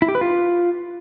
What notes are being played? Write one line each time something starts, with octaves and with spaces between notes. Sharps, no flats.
E4
G4
B4
F4